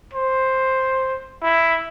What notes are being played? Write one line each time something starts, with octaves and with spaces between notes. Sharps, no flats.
C5
E4